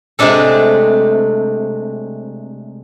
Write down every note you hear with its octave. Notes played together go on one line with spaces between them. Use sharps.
C3 G#3 A3 D4 A4